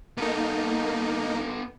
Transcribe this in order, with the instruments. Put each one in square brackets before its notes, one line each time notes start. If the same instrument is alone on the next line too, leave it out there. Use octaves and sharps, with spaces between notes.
[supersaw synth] A#3 D#4 [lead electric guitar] B3 A4